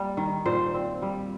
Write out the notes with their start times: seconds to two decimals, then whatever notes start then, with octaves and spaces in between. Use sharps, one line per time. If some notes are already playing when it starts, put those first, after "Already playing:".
Already playing: G3 A#3
0.17 D#3
0.46 A#2 C5
0.74 C4
1.02 G3